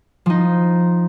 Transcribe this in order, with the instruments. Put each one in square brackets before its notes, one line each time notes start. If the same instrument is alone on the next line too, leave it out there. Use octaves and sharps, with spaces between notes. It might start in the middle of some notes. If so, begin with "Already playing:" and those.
[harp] F3 D#4